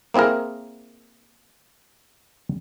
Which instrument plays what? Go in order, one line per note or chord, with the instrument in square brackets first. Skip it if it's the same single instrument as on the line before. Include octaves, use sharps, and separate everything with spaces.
[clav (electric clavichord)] A#3 C4 E4 G#4 A#4